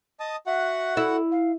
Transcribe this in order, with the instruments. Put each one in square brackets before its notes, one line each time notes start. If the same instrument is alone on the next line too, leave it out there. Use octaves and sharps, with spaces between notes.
[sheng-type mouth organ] D#5 A5 D#6
[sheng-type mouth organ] F#4 F#5 [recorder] E5
[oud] E4 [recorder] A4
[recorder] F5